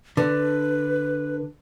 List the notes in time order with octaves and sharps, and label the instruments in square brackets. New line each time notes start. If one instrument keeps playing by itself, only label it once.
[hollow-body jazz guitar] D3 [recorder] B4